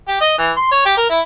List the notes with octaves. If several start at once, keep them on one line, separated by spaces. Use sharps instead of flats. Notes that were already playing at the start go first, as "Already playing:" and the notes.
G4
D#5
E3
C6
C#5
G4
A#4
E4